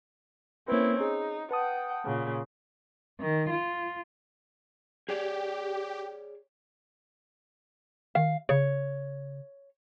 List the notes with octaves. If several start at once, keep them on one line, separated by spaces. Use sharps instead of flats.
A#3 C4 C#4 E4 B4
D#4 G#4
B4 F#5 G5 A5 D#6
A#2 C#3
D#3
F4
G4 G#4 C#5 D5
D#3 F5
C#3 C#5